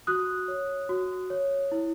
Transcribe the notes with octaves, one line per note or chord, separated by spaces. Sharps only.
F#4 D#6 F#6
C#5
F#4
C#5
E4